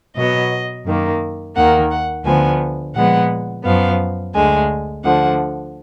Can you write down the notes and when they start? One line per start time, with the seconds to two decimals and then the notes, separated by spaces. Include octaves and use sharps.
0.15 B2 F#3 B3 D#5
0.85 F#2 D#3 A#3
1.55 D#2 D#3 A#3 F#5
1.91 F#5
2.25 D2 D3 F3 B3 G#5
2.95 A#2 F3 G#3 B3 F#5
3.65 F#2 F3 B3 F5
4.34 D2 D3 G#3 G#5
5.04 D2 D3 F3 F#5